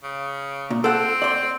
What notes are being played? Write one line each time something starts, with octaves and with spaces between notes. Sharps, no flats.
C#3
A#2
C4 A4 F#5
D5 C6